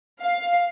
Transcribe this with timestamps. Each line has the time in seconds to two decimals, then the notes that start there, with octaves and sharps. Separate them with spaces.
0.23 F5